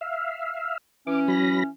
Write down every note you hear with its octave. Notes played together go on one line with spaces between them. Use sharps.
E5 F5
E3 C#4 D6
F#3 B5 A#6